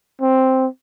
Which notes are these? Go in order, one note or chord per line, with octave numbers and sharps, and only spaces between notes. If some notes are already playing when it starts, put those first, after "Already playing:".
C4